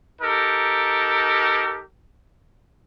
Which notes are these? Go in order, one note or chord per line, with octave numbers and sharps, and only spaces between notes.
D#4 G4 A4 A#4